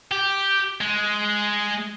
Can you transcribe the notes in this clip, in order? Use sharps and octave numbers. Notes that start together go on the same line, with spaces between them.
G4
G#3